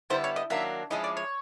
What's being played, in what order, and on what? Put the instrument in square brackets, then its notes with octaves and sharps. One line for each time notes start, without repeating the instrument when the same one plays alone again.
[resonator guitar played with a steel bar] D3 G3 B3 E4 [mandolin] C5
[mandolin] C#5
D#5
[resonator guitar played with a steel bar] D#3 F#3 A#3 D4 [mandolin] E5
[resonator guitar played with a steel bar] F3 G#3 C#4 E4 [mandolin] D#5
[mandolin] D5
C#5